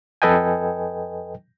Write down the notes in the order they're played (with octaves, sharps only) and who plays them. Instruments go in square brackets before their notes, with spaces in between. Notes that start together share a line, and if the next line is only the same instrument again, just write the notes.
[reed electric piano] F2 A4 B4 D#5 G5 G#5